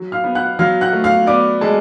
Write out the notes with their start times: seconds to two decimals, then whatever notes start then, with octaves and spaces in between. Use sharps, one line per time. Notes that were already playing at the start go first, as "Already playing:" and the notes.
Already playing: F#3
0.12 F5 F6
0.24 B3
0.35 F#5 F#6
0.59 F#3 F5 F6
0.81 F#5 F#6
0.93 A3
1.04 F5 F6
1.27 B3 D5 D6
1.61 G#3 A4 A5